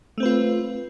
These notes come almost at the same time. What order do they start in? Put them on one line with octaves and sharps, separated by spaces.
A3 C4 B4 F4